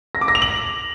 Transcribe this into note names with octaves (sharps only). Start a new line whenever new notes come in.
A#6
D6
A#6
F7
F#7